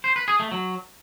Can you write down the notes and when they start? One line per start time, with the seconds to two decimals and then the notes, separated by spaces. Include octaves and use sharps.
0.04 C5
0.16 B4
0.28 G#4
0.40 A3
0.52 F#3